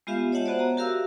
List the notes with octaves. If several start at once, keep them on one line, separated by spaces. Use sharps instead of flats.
G#3 B3 F4 G4 E5 F5
C#5 D#5 E5 F#5 A5
B3 F#4 C5 D5
A#5
F#4 G4 A#4 E5 F5 E6